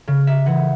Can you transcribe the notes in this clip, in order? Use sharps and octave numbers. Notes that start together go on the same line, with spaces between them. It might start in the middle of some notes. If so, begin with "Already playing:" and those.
C#3
E5
E3 F#5